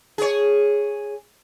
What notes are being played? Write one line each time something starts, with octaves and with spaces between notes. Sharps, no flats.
G#4 C#5